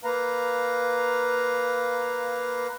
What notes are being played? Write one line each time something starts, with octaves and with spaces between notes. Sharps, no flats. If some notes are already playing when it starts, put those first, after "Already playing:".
A#3 B4 F5 A#5